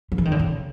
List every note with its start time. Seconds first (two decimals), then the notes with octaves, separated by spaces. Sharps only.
0.12 F3
0.18 E3
0.25 D#3
0.32 D3
0.39 C#3